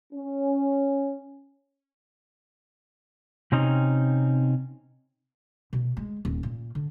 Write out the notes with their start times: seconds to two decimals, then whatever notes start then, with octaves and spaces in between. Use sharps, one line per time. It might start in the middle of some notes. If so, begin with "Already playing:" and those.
0.13 C#4
3.52 C3 C4 C#4 D#4
5.73 B2
5.97 G#3
6.25 D#1
6.43 A#2
6.75 D3